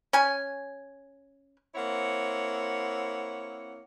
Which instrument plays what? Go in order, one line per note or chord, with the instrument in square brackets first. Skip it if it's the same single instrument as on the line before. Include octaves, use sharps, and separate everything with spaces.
[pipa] C#4 G#5
[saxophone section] A#3 C4 E4 C#5 F#5